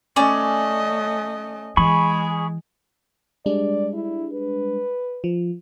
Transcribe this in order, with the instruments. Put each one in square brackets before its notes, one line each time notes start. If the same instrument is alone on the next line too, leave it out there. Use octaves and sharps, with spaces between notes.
[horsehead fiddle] A3 D#5 [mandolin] C#4 D5
[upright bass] E3 [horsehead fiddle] G#3 [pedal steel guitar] G#4 B5 C#6
[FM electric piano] G3 G#3 D4 [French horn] D5
[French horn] E4
B4
[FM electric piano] F3